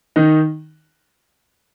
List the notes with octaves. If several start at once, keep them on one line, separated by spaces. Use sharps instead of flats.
D#3 D#4